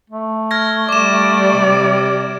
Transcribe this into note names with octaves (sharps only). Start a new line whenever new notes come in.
A3
F6 G#6 A#6
G3 D5 D6 E7
C3